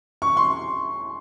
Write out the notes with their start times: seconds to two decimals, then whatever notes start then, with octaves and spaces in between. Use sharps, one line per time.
0.22 C#6
0.37 C6